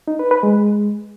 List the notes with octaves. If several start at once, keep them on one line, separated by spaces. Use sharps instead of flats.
D#4
B4
B4
G#3